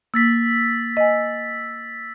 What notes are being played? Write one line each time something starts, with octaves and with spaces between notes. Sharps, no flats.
A#3 E6 A6 B6
D#5 G#5